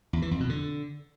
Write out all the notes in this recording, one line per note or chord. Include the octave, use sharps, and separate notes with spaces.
E2
E3
F2
B2
D3